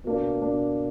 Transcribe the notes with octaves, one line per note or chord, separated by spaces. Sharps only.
B2 A#3 D4
B2 A#3 D4